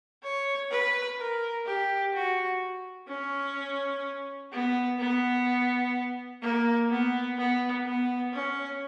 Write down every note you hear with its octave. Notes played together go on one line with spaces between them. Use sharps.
C#5
B4
A#4
G4
F#4
C#4
B3
B3
A#3
B3
B3
B3
C#4